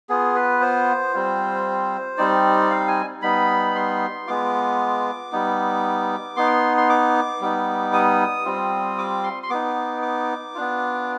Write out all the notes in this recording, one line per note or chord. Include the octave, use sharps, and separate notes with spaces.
B3 F4 G#4
B4
C5
G3 C4 F4
G3 C4 D#4 D5
F5
G#5
G3 B3 D#4 B5
C6
G#3 B3 F4 D6
G3 B3 D#4
B3 D#4 C6
C6
D6
G3 B3 D#4
D#6
G3 C4 F4
D6
C6
C6
B3 D#4 D6
D6
B3 D4 F4